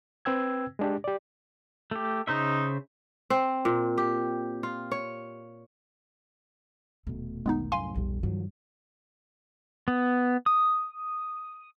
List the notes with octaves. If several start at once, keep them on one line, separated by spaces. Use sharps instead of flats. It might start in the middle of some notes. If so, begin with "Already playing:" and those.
C4 B4 G5 E6 G#6
G#3 D4 G4
G4 D5
A3 G4
C#3 D#4 C5 E5
C4
A#2
G4
F4
C#5
D#1 B2 A3
E1 B1 D#3 G#3 B3 D#4
C2 F#2 A2 F5 G#5 C6
D#1 B1 F2 G3
G2 D#3 F3 F#3
B3
D#6